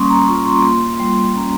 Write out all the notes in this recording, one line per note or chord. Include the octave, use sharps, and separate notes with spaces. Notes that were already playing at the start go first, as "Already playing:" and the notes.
Already playing: G3 A#3 C#4 C6 C#6 D#6
A#5
F4 C#6
C6
A#3
G3
C#4 A#5